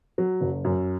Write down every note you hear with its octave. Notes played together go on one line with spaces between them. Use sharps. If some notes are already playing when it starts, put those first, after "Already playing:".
F#3
F#1
F#2